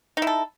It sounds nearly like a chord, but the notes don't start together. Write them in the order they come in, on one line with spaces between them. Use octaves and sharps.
D#4 E4 A4